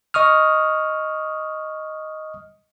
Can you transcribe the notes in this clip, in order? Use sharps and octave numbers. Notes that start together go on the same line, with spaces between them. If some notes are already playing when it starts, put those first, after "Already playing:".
D#5 C#6 D#6 F6